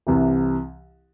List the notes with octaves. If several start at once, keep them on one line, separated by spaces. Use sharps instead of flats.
C2 C3 E3